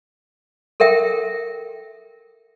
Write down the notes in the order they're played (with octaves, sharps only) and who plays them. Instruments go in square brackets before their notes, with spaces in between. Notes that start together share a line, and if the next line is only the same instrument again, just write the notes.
[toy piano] A4 A#4 E5 G5